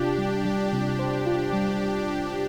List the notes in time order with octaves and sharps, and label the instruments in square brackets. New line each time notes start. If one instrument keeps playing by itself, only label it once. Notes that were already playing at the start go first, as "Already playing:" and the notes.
Already playing: [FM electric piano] C3 F4 [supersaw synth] D4 G4
[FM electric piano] G3
G3
C3
C5
[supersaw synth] D4 G4 [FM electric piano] F4
[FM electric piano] G3